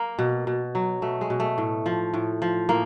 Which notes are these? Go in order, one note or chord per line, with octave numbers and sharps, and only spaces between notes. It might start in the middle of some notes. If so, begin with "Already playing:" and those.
Already playing: A#3
B2
B2
F#3
B2 A3
G#3
B2
A3
A2
F3
A2
F3
A2 A#3